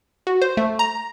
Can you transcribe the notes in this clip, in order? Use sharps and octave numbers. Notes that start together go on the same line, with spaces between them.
F#4
C5
A3
A#5